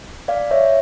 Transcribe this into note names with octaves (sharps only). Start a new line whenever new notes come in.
D5 F5
C#5 E5